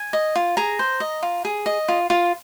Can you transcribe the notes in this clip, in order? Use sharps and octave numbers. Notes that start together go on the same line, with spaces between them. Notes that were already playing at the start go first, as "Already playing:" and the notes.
Already playing: G#5
D#5
F4
G#4 A#5
C5
D#5
F4
G#4
D#5
F4
F4